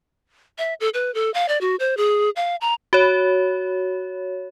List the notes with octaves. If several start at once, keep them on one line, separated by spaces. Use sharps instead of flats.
E5
A4
B4
A4
F5
D5
F#4
C5
G#4
F5
A#5
F#4 C#5